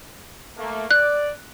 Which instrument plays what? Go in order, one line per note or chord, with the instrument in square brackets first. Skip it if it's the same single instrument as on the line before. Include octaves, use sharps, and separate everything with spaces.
[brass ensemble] A3 A#3
[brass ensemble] D5 [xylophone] F#6